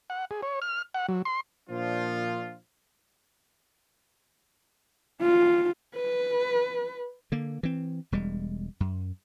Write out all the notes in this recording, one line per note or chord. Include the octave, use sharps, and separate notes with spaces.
F#5
G#4
C#5
F6
F#5
F#3
C6
A#2 F3 D4 F4
F4
B4
D3 A#3
E3 C4
E1 G3 G#3
F#2